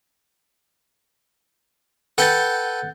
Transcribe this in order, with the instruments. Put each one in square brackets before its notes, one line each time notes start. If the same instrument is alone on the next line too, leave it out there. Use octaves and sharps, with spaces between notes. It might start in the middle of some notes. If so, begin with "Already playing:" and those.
[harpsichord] A4 B4 G5 [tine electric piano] F#5 G6 A6